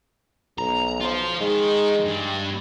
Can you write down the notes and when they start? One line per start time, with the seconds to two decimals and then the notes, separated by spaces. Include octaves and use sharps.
0.58 B1 A#5
1.01 F4 C5
1.41 D#3 G#3
2.05 G2